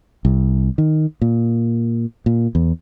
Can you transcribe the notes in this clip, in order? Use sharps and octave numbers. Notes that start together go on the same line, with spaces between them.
C2
D#3
A#2
A#2
E2